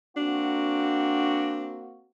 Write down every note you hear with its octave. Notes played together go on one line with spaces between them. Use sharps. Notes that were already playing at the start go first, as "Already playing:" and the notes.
A#3 C4 D4 F#4